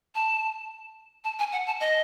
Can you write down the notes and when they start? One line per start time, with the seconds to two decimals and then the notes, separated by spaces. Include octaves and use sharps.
0.15 A5
1.24 A5
1.39 G#5
1.52 F#5
1.67 A5
1.80 D#5